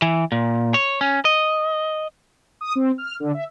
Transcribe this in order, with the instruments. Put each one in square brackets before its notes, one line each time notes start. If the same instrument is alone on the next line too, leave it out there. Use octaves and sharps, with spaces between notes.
[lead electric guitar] E3
A#2
C#5
C#4
D#5
[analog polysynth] D#6
C4
F6
D3
E5